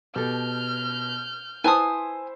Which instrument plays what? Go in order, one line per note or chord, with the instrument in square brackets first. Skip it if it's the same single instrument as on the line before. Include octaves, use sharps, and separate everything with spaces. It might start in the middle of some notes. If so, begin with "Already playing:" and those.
[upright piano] B2 [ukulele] G4 A4 [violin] F6 G6
[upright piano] E4 C5 [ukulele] B4 A5 [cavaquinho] G#5 D#6